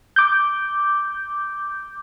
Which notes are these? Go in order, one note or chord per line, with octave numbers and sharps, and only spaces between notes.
D6 G6